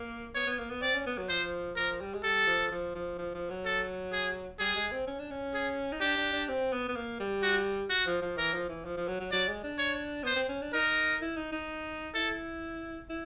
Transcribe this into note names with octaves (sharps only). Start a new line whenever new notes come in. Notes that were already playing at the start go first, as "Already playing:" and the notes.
Already playing: A#3
B3 C#5
B3
A#3
B3
C4 D5
C#4
B3
F#3
F3 C5
F3 A#4
G3
G#3
G3 A4
F3
F3
F3
F3
F3
F#3
A4
G#4
G3 G#4
G#3
C4
C#4
D4
C#4
G#4
D#4
D4 G4
D4
D4
C4
B3
B3
A#3
G3
F#4
F#4
F3
F3
E3 A#4
F3
E3
F3
F3
F#3
F#3
F#3 D5
G#3
D4
C#5
B3 C5
C4
C#4
D4
D#4 A#4
E4
D#4
D#4
E4 A4
E4